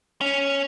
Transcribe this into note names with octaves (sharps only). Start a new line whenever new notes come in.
C#4